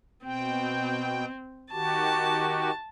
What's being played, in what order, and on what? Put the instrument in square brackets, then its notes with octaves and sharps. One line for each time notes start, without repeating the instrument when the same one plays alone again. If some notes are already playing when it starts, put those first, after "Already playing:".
[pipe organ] B2 G5 [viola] C4
[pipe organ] D#3 F#4 G4 [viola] A5